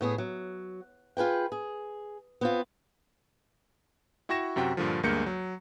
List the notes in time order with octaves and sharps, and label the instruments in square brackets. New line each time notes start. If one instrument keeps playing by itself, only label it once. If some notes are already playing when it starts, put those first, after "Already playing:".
[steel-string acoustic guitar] A2 B3 G#4
F#3
F4 G#4 B4 G5
G#4
B3 C4 F4
[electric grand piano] E4 F#4 G5 C#6 A#6 E7
F#2 C3 F#4 G5
G2 A#2 D3 F3
D2 G2 G#3 A#3 G6 C#7
F#3